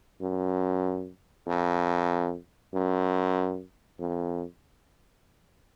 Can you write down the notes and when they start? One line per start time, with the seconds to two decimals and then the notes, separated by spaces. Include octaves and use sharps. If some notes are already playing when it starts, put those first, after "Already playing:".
0.22 F#2
1.47 F2
2.74 F#2
4.00 F2